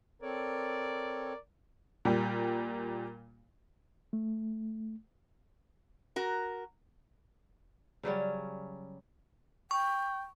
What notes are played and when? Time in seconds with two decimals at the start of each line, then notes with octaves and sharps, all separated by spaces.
0.22 C4 A4 A#4 C#5 D5
2.05 A#2 G3
4.13 A3
6.16 F#4 A#4
8.03 C#3 F#3 G3 C#4
9.71 G5 C#6